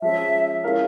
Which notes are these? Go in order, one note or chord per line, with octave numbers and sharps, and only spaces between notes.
F3 G#3 C#4 E5
G#3 C#4 E4 A#4 F5